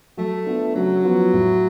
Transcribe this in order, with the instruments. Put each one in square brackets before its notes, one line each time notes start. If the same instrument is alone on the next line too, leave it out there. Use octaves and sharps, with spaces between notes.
[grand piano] F#3 [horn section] A3
[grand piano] B3 D4 F4
[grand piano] C#3 [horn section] F#3
[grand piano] F3 B3 F4
A2